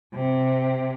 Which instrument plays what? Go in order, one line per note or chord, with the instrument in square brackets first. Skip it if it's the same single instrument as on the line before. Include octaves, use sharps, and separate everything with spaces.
[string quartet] C3